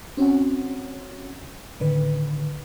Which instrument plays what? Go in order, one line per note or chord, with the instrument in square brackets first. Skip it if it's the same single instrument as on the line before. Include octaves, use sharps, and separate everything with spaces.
[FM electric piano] C4 C#4 F#4 C#5 F#5
A2 D3 D#3 B4